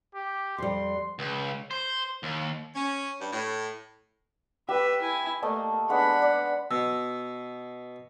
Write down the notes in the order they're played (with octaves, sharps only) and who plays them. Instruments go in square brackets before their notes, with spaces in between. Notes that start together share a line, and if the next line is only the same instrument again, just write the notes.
[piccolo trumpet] G4
[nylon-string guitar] F2 G3 [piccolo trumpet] C6
[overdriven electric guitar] C#2
C5
D#2
[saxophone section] C#4
G2
A2
[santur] G4 G5 [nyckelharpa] B4 E5
[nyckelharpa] E4 G#5
[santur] A3 D#5 A5 [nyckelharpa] A#3
[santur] G#3 B3 D4 [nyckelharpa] F#5 B5
[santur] D5
[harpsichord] B2 [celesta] E6